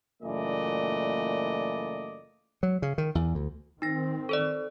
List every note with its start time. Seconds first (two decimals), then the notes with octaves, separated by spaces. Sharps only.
0.22 F#1 A#2 E3 A3 D5 D#5
2.63 F#3
2.82 C#3
2.98 D#3
3.15 E2
3.35 D2
3.82 D#3 C4 D#4 A#6
4.29 A4 C5 D5